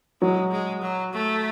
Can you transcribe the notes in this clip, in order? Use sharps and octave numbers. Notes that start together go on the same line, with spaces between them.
F#3 G#3
G#3
F#3
A3